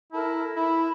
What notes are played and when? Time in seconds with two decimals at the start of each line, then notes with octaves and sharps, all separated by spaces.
0.13 E4 A4 A#4 A5
0.56 E4 B5